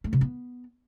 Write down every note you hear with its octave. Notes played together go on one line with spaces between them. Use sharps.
A3
C3
B3